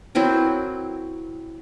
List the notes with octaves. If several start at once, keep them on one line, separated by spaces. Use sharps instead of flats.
F#3 C4 E4 A#4